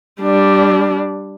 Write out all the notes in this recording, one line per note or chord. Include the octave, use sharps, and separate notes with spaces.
G3 D4